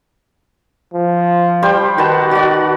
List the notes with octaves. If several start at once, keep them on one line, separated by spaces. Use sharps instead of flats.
F3
G3 C5 G5
D#3 F#4 B4 A5
F#4 D5